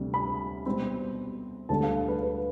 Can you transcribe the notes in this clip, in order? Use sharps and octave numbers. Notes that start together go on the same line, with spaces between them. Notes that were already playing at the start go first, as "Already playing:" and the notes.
Already playing: D2 C3 G3
B5
B2 G3 C4
D2 D3 G3 A5
F5
B4
B4